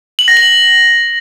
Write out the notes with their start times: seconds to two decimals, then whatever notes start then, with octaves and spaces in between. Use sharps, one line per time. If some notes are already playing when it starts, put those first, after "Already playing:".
0.19 F#7
0.28 A#6
0.37 F#7